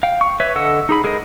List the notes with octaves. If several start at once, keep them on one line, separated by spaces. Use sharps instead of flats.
F5 G5
C#6
B4 C#5 E5
D3 A4 D#5 F#5 E6
D#4 G#4 B5
G#3 G#4 A#4 C5 D#5